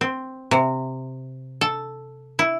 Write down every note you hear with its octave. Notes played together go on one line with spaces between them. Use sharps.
C4
C3
A4
E4